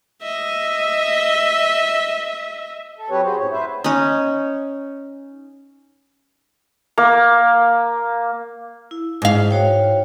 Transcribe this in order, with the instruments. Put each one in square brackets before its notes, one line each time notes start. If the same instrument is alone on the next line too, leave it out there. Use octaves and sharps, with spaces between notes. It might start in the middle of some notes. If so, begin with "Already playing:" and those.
[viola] D#5 E5
[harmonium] A4
F#3 C4 G4 B4 C#5
F#4 G#4 C5
F#2 A2 C#5
B4 C5 E5
[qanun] C#4 D#4
[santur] A#3
[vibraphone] E4
[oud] G#2 F5
[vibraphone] F#4 C#5 G5